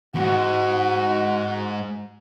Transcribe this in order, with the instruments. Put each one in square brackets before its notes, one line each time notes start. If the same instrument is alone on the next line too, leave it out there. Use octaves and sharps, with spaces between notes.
[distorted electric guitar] E2 G#2 [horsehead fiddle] F#4